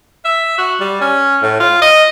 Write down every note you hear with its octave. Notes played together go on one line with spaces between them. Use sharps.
E5
F#4
G3
C#4
A2
F4
D#5